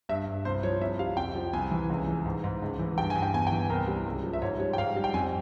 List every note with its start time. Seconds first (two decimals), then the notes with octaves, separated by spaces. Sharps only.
0.09 G2 E5
0.27 G2
0.45 C2 C5
0.63 F3 C#5
0.81 C2 E5
0.99 G3 F5
1.17 F2 G5
1.35 F3
1.53 C2 G#5
1.71 E3
1.90 C#2
2.08 E3
2.26 G#2
2.44 G#2
2.62 C#2
2.79 E3
2.98 G2 G5
3.10 G2 G#5
3.23 G5
3.34 E2 G#5
3.47 G5
3.52 E3
3.70 C2 A#4
3.88 G3
4.06 C#2
4.24 F3
4.33 E5
4.42 G#2 C#5
4.60 G3 C#5
4.73 G5
4.78 G#2 F5
4.96 G3
5.04 G5
5.14 F2 G#5